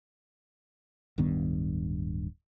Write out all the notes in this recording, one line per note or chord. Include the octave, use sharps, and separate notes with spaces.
D1 G2 D#3 B3